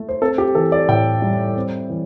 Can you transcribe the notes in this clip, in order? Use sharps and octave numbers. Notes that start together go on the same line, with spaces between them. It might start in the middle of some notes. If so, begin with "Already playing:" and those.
Already playing: A3
C5
C4 A4
G4
E3 A4
D5
A2 G5
G3
C4
E3